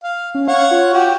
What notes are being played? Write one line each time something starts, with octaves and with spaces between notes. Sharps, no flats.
F5
C#4
C#5 F5 F#5
F4
F#4 G4